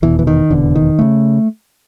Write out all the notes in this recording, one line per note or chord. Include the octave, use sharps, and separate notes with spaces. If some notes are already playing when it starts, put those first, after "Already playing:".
F1 E2 B2 E3
E3
D#3
F1 E2 B2 D3
D#3
C#3 A3